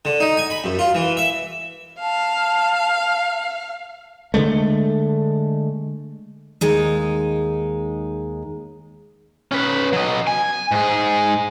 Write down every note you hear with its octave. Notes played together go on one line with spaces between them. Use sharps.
D3
D#4
G#5
B5
F#2
F4
E3
E5
F5 A5
D3 E3 G#3 A3
D#2 G#3 D#4
C#4 B4
F#3 D#5
G#5
G#2 G#4